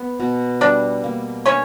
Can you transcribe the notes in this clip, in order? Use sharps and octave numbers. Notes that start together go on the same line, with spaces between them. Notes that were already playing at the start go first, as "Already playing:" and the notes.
Already playing: B3
B2
G3 D4 D5
A#3
C#4 D4 C#5